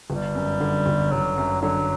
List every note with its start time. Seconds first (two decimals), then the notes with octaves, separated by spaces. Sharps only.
0.10 G1 G3
0.35 F#2
0.60 D3
0.86 G1
1.12 G1 F#3
1.38 F#2
1.62 D3 F#3